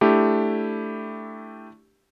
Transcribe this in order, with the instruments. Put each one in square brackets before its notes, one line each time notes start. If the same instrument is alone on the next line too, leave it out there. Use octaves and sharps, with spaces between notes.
[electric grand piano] A3 D4 E4 G4